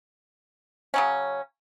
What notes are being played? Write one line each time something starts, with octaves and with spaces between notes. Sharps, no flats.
C#3 F#3 C#4